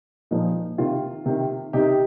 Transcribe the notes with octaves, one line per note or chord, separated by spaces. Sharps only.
A#2 F3 D#4
C3 D#3 F4
C3 D#3
C3 D#3 D#4 G4